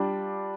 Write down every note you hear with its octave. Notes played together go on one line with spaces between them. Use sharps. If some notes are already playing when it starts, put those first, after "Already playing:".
Already playing: G3 D4 F4